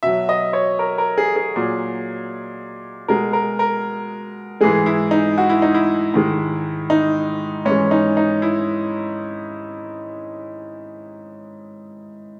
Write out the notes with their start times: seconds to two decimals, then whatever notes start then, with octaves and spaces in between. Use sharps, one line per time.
0.03 B2 F#3 E5
0.29 D#5
0.53 C#5
0.79 A#4
0.98 A#4
1.18 G#4
1.36 G#4
1.56 A#2 F#3
3.08 B2 G#3 A#4
3.33 A#4
3.59 A#4
4.61 G#2 E3 G#3 G#4
4.86 E4
5.11 D#4
5.38 F#4
5.49 E4
5.62 D#4
5.74 E4
6.14 G#2 D#3 G#3
6.90 D#4
7.65 G#2 E3 G#3 C#4
7.91 D#4
8.17 D#4
8.42 E4